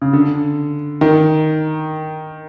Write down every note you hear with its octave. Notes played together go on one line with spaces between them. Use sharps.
C#3
D3
D#3